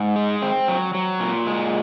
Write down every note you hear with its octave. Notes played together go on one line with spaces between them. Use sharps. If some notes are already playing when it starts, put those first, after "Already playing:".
Already playing: G#2
G#3
C4
F#3
F#3
A#2
G#3